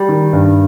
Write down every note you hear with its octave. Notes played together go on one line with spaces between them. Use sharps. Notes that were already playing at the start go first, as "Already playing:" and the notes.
Already playing: G3
D#3
G2